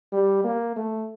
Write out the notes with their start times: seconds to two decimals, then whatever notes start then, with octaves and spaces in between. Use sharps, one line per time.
0.12 G3
0.44 A#3
0.76 A3